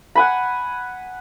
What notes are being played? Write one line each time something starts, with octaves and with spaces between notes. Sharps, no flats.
F#5 G#5 B5